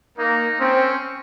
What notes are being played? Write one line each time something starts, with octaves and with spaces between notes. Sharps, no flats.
A#3 D#4
C4 C#4